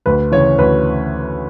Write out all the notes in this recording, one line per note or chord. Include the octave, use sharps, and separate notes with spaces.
D2 B4
C#3 E3 C#5
D2 B4